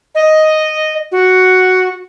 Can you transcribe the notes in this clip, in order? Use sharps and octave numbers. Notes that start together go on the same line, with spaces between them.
D#5
F#4